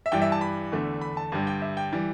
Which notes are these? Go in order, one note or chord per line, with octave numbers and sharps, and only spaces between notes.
E5
G2 E3 G3 G5
E5
A5
B5
E2 D3 A3
B5
A5
G2 D3 G3
G5
E5
G5
E3 G3